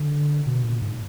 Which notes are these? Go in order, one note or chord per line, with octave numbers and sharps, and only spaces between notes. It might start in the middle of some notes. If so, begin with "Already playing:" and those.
Already playing: D3
B2
A#2
G#2